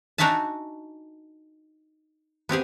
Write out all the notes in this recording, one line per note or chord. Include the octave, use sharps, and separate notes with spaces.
D4 D#4 F#4 G#4 E5 A5
B3 C4 G4 G#4